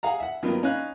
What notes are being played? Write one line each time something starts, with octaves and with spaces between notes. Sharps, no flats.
G#4 F5 F#5 A#5
E5 F#5
G2 D#3 F#3 A#3 B3 F4
C#4 D#4 C#5 D#5 F5 F#6